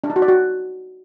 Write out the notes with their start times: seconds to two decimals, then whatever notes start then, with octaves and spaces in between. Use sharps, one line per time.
0.04 D4
0.10 D#4
0.16 F#4
0.22 D5
0.28 F#4